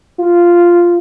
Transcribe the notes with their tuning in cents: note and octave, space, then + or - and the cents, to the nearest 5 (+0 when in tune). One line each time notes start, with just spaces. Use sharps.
F4 -5